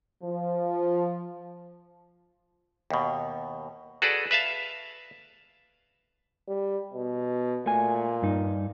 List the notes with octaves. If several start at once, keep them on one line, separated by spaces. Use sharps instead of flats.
F3
D#2 B2
F#4 G#4 A4 B4 D5
B4 E5 F5 A5
G3
B2
A#2 A3 G#5
G2 D#4